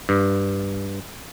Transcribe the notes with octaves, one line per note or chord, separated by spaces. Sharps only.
G2